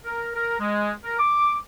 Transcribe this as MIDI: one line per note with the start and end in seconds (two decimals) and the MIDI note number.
0.05 0.30 70
0.34 0.55 70
0.60 0.91 56
1.04 1.19 70
1.19 1.56 86